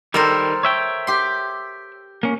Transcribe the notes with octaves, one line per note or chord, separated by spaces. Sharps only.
D#3 G3 A4 A#4 C5
C#5 E5 G5
G4 C6
A#3 C#4